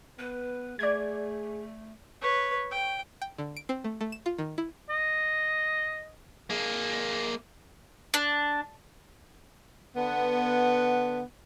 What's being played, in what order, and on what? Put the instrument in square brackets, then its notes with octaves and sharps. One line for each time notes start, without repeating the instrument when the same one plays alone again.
[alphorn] B3 [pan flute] B4
[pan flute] A3 [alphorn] G#4 [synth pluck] D5 G#6
[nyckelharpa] B4 C#5
G5
[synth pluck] G5
D3
D7
C4
A3
A3
E7
F4
D#3
E4
[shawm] D#5
[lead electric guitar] A#3 G#4
[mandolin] D4
[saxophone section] D3 B3